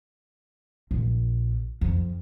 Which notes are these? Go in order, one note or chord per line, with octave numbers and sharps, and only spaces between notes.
A#1
F2